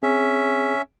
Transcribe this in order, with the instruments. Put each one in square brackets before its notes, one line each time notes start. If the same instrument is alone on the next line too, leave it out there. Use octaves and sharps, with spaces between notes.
[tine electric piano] C4 G#4 [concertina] C#4 E5